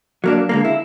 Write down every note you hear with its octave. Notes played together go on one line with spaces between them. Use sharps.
F#3 A#3 D4
D3 G#3 A#3
E4